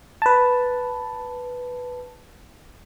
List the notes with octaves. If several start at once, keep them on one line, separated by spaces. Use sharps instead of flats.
B4 A5